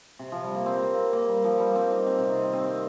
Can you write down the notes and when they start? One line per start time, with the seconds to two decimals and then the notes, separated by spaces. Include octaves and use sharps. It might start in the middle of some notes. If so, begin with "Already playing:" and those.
0.19 C3
0.32 F3
0.43 G3
0.55 A#3
0.66 C4
0.82 A#3
1.13 A#3
1.29 G3
1.44 F3
1.60 G3
1.76 C4
1.91 D#4
2.07 C4
2.19 C3
2.30 D#3
2.42 C4
2.53 C4